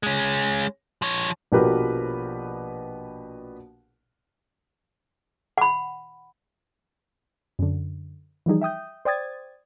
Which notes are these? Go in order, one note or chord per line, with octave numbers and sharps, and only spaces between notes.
G#3 C#4
F3 C#5
A#1 B2 F3 G4 A#4 B4
F#5 B5
F#2 D3
E3 F3 G3 D#4 G#4
E5 G5 D#6 G6
C5 D5 G5 D#6 G#6 A6